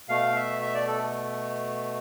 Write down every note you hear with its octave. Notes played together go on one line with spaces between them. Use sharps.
B2 A3 F5
E5
E5
D5
A4